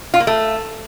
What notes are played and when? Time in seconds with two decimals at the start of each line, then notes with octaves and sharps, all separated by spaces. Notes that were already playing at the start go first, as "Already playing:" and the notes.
0.14 F4
0.20 A#3
0.27 A3